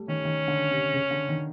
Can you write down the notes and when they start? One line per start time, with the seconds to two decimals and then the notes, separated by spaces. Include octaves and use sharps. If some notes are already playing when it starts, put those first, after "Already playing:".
Already playing: G3 A3
0.08 D#3 C#4
0.25 D#3
0.48 D3
0.71 C3
0.94 C#3
1.11 D3
1.29 D#3